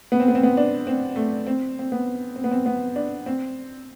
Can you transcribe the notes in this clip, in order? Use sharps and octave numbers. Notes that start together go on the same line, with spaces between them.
B3
C4
B3
C4
B3
D4
C4
A3
C4
C4
B3
C4
B3
C4
B3
D4
C4